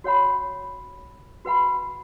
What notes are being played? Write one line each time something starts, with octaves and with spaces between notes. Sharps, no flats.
F#4 C#5 F#5 B5
F#4 B4 F#5 B5